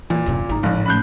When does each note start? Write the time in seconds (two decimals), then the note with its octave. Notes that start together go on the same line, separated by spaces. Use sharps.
0.10 A#2 E3
0.26 D#1 F#2 C3
0.49 G#1 G#2 D#4 A#5
0.63 F#1 A2 F3 G#3
0.86 A3 C#4 B5 F#6 G6